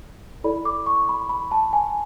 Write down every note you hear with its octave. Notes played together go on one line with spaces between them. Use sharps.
E4 A4 D5 B5
D6
C#6
B5
B5
A5
G#5